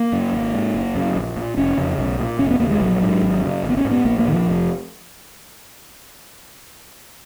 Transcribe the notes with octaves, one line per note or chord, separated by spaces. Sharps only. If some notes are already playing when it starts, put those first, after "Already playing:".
Already playing: A#3
F#2 C#3
G#1
G#2
F#1
F#2 C#3
A#1
A#2
F1 C#4
F2 C#3
B1
A#2
F1 C#4
B3
D#2 C#3 A#3
G#3
A#1 F#3
G#2
G#1
F#2 C#3
G#1
B3
C#4
G#2
B3
A#1 A#3
A#3
A#2 D#3
F3
F1